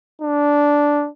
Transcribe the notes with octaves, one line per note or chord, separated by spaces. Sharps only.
D4